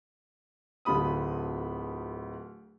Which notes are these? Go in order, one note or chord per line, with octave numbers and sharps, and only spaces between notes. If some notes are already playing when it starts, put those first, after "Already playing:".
D1 D2 F4 B5 D#6